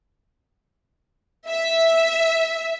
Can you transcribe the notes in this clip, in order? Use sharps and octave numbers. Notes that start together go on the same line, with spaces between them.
E5